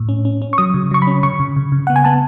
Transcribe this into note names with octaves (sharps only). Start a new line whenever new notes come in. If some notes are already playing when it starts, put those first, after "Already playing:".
Already playing: A2
C#4
C#4
C#4
C#6
F#3 D#6
C#3
F#3 C#6
B5
C#4
C#3 C#6
C#3
C#3
C#3
B3 F#5
G#5
B3 A5